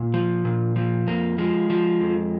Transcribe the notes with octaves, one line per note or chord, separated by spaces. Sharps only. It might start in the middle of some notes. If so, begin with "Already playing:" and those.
Already playing: A#2
F3
A#2
F3
F2 A#3
F3 G#3
F3
F2